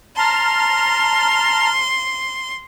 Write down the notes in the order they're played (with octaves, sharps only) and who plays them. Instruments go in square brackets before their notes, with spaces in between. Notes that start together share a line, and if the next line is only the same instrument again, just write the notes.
[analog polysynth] A5 A#5 F6 [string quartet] C6